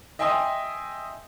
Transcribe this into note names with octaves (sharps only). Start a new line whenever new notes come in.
D#5 E5 G5 G#5 C6 D#6